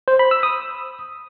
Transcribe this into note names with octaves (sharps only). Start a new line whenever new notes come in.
C5
B5
E6
D#6